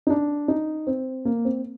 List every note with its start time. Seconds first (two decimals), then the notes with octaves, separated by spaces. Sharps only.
0.07 D#4
0.10 D4
0.48 D#4
0.87 C4
1.25 A#3
1.45 C4